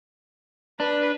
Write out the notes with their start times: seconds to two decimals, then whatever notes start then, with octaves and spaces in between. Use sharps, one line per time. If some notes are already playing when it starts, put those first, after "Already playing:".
0.80 D4 B4